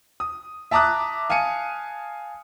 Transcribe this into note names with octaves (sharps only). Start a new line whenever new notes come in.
D#6
E5 A5 A#5 D6 D#6 F#6
F5 G#5 A5 C#7 D#7